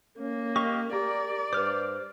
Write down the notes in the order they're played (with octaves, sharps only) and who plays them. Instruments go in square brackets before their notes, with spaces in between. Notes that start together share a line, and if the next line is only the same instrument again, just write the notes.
[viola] A#3 [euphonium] C#4
[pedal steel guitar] G4 D#5 F5 [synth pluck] C#6
[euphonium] G4 [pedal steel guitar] A#4 [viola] D5
[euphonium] G2 [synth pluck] B4 D6 [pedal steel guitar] C5 F6